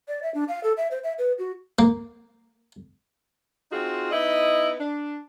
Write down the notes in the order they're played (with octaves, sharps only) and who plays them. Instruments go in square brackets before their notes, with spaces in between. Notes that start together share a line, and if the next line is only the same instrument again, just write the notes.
[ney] D5
E5
D4
F5
A4
E5
C5
E5
B4
F#4
[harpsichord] A#3
[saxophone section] C4 D#4 F4 F#4 G#4
B3 D#4 E4 D#5
D4